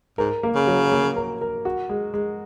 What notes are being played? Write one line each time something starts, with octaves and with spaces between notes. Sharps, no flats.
G#2 A#4
A#3
C#3
F#3
A#3
A#4
A#4
F#4
G#3
G#3